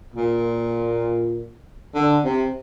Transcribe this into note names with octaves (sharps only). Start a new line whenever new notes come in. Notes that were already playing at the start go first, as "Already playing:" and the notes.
A#2
D3
C3